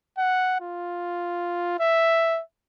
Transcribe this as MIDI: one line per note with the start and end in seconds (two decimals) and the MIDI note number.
0.18 0.57 78
0.61 1.79 65
1.80 2.41 76